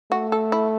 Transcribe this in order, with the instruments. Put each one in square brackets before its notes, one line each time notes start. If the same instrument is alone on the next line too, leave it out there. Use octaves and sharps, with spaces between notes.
[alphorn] A3 [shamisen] F#4
[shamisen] A4
E4